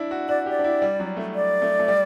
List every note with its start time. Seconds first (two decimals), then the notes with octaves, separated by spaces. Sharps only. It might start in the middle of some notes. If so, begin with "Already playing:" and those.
Already playing: D4 E4
0.11 F#4
0.28 F#4 D5
0.46 G4 D5
0.59 D4
0.64 E4
0.82 G3
1.00 F#3
1.17 A3
1.35 D5
1.62 A3
1.80 A3
1.88 G3